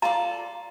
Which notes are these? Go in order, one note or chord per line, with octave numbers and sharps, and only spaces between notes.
F4 A4 D5 A#5